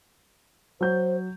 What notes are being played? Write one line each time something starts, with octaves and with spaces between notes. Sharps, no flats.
F#3 C5 G6